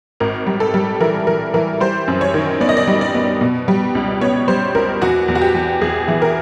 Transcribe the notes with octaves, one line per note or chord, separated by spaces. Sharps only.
G#1 A#4
G3
A4
G3
E3 A#4
E3 A#4
E3 A#4
G3 C5
F#2
C#5
D#3
B3 D5
D#5
D5
G3
D5
B3
B2
G3
C#2
B3 C#5
G3 C5
C#2 A#4
E2 F#4
E2
F#4
G4
E2
E2 G#4
E3
A#4